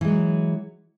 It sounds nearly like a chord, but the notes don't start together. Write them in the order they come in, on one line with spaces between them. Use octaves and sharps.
E3 G#3 F#3